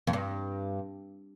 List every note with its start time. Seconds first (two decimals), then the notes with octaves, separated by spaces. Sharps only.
0.07 F2
0.13 G2